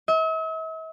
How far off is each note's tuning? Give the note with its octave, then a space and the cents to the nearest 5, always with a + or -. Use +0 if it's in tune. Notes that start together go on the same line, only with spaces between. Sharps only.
E5 -45